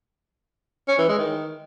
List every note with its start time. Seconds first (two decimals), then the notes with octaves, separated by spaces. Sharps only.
0.88 C#4
0.98 E3
1.09 G#3
1.19 D#3